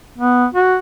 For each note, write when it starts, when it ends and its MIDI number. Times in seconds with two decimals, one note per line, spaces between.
0.18 0.46 59
0.54 0.77 66